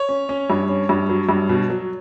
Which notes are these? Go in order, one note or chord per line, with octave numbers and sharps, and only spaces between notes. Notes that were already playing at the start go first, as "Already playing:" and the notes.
Already playing: C#5
C#4
C#4
G2
C#4
G2
F#3
G2
B2
F#3